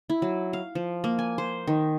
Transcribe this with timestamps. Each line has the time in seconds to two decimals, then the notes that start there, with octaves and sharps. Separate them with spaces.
0.10 E4
0.22 F#3
0.53 F5
0.75 F3
1.04 A#3
1.19 G#5
1.38 C5
1.67 D#3